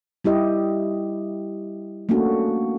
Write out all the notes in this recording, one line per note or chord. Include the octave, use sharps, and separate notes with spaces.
G3 E4 G4 D#5
A3 A#3 C#4 D4 F#4